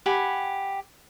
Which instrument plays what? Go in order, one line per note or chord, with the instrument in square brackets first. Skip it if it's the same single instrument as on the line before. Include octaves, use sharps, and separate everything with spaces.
[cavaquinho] G4 F#5 G#5 B5